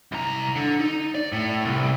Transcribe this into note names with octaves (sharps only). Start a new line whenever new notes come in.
C2 A#5
D3
D#4
D5
A2
C2